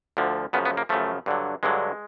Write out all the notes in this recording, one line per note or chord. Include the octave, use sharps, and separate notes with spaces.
D2 D3 F3
F#2 C#3 F3 B3
B3
A#3
F#2 C#3 F3 A3
G2 D3 F#3
G2 D3 F#3 G#3